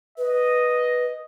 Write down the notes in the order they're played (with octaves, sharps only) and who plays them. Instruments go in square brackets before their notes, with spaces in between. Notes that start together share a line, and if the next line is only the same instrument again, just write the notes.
[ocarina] B4 [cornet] D#5